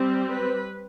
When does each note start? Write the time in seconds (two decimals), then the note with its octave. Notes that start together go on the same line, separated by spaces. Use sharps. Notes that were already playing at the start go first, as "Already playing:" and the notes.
Already playing: G3 C4
0.30 B4